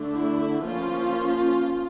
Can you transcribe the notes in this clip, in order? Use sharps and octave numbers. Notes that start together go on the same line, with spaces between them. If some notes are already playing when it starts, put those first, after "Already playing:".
Already playing: D3 A3 D4
E4
F3 A#3 C#4 F4